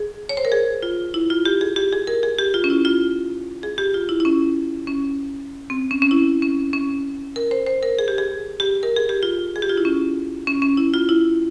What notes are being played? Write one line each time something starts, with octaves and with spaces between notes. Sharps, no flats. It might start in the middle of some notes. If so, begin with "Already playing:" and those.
Already playing: G#4
C#5
C5
A#4
G#4
F4
E4
F4
G4
G#4
G4
G#4
A#4
G#4
G4
F4
C#4
E4
F4
G#4
G4
F4
E4
E4
C#4
C#4
C4
C#4
C#4
E4
C#4
C#4
A#4
C5
C5
A#4
G#4
G4
G#4
G4
A#4
G#4
G4
F4
G#4
G4
F4
E4
C#4
C#4
C#4
E4
F4
E4